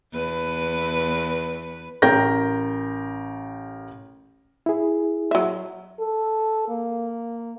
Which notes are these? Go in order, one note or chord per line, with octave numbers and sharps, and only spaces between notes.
E2 B4
A1 A#4 G5 G6 A#6
E4 G#4
F#3 E5
A4
A#3